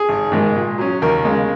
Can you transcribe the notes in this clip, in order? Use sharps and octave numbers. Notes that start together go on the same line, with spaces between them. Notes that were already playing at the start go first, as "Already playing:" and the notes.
Already playing: G#4
G#1
G#2 D#3 G#3
A#2
F#3 C#4
D#2 A#4
C#3 G#3